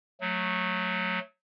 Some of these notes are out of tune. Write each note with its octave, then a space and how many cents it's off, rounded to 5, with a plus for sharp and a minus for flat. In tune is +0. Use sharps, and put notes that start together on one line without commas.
F#3 -15 A3 +0